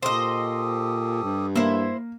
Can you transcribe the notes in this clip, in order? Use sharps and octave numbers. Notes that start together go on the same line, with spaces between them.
A#2 G4 A4 C5 D#5 D#6
G2
A#3 E4 C5